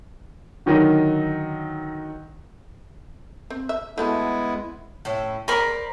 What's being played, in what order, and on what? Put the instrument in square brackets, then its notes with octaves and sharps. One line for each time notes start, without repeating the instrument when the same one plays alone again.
[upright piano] D3 D#3 F#3 D#4
[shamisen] C4
E5
[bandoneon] G#3 B3 E4 [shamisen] A3 F#4 A5
[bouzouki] A2 C#4 E4
[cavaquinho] A#4 B5 [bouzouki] C5 D5